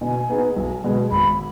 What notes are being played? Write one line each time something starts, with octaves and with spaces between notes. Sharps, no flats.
B2 G#5
B3 D#4 G#4 B4
B1
B2 G#3
G#1 B5